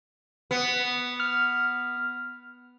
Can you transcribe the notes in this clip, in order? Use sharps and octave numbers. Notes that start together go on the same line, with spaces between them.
B3
F6